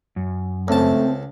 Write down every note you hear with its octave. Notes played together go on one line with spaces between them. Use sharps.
F#2
C#2 A3 C4 A5